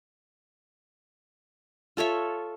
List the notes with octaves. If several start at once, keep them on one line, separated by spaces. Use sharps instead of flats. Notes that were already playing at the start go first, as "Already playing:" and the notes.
F4 A4 C#5 E5